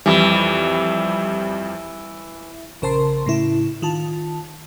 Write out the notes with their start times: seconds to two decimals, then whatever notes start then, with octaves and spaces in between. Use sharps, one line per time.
0.06 F2 E3 G3
2.82 A#1 C#3 A#4 C5 A5 C6
3.26 A2 C#3 E4
3.82 D#3 F4 A5